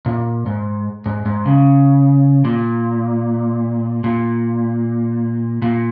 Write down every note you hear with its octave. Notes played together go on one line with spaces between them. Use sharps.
A#2
G#2
G#2
G#2
C#3
A#2
A#2
A#2